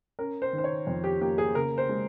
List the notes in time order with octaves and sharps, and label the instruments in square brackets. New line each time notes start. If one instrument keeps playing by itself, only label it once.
[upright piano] C#4 A#4
C5
D#3
C5
C#5
F2
G4
A#3 G4
G#4
C#3 A#4
C5
G#3